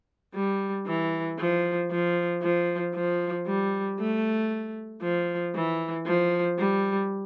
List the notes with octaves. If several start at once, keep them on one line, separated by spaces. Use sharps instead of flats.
G3
E3
F3
F3
F3
F3
G3
A3
F3
E3
F3
G3